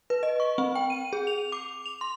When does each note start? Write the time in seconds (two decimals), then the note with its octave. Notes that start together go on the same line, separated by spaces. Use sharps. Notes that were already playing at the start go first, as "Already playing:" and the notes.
0.10 B4
0.23 D#5
0.40 C#6
0.58 C4
0.75 G5
0.90 D#7
1.13 G#4
1.27 F7
1.52 D6
1.86 F7
2.01 C6